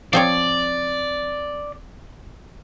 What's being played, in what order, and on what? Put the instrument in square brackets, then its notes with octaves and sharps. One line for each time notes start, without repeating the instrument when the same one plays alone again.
[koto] F3 C4 C#5 [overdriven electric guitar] D5